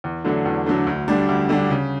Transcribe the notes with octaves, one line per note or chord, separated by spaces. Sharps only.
E2
D3 F#3 A3 D4
E2
D3 F#3 A3 D4
D2
D3 G3 D4
D2
D3 G3 D4
C#3